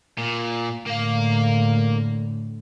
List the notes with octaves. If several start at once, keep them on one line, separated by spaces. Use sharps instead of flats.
A#2
A2 D3 A#3 F5